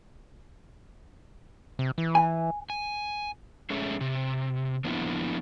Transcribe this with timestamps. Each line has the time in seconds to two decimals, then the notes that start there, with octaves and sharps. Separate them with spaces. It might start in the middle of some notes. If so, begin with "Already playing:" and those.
1.79 C3
1.98 E3
2.15 G#5
2.70 G#5
3.70 G#3 A3 C#4 G#4 A4 E5
4.01 C3
4.84 F3 A#3 B3 D4 E4 F4